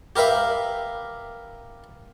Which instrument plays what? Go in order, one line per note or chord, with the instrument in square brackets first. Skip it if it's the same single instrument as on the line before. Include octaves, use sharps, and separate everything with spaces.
[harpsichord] G4 A#4 B4 E5 F5